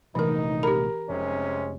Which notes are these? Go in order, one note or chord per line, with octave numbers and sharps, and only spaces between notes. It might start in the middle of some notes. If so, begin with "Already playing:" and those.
A#1 C3 E3 A3 D#4 A#4
G4 A#4 B5
F1 C3 G#3 C#4